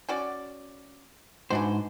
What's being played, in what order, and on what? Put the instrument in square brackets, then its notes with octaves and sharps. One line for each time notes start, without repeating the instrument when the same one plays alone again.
[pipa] C#4 F#4 D5
[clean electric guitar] G#2 C5 [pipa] E3 D4 F#4